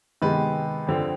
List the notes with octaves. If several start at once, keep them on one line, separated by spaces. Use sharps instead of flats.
C3 D#3 G#3 B3 B4
F2 D3 F3 C4